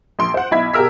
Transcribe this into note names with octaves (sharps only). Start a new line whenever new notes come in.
A#1 C6 D7
C5 F#5
B1 E4 B5 G#6 B6
B2 G4 G#4 A#4 E6 B6